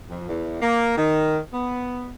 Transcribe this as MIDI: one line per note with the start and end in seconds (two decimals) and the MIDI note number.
0.09 0.24 41
0.28 0.61 40
0.61 0.96 58
0.97 1.38 51
1.52 2.09 59